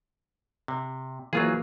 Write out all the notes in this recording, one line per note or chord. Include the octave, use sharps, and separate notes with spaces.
C3
E3 F#3 A#3 F4 G#4